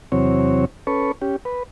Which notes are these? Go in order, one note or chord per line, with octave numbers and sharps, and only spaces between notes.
E2 C3 F#3 C4 C#5
C#4 A4 B4 C#6
C#4 G4
B4